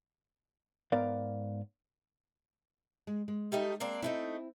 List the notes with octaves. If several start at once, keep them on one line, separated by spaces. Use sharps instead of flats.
G#2 B3 A#4 D5 F5
G#3
G#3
G3 A3 D#4
A#3 C4 D4
D3 A3 C4 D#4 E4